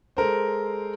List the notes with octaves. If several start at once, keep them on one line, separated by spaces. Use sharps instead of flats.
G#3 A4 A#4 C5